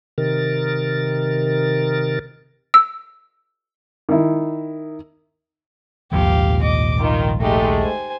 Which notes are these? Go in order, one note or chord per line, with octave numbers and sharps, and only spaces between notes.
C3 D#3 A#4 A6
E6
D#3 E4
D#1 A#1 D#2 G#2 C3 F3 G4 F5
D#5 D6
D#3 F4
G#3 A3 D#4 G4
C5 G#5